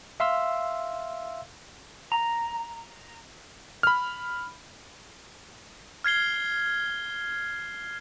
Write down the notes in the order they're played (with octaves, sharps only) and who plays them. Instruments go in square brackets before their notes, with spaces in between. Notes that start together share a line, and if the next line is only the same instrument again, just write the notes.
[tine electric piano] E5 F5 C6 E6
[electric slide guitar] A#5
[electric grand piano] B5 F6
[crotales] F6 G#6 C7 G7